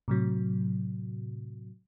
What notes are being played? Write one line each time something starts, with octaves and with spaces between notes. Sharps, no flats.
A2 C3 F#3